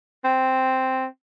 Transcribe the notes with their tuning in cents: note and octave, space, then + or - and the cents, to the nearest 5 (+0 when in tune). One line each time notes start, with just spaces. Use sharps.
C4 -5